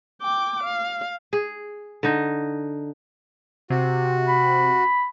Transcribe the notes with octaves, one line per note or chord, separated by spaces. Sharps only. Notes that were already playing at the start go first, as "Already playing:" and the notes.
G5 D6
F5
G#4
D3 D#4
C3 F#4
B5